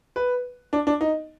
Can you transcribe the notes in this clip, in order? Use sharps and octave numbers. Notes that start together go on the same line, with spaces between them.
B4
D4
D4
D#4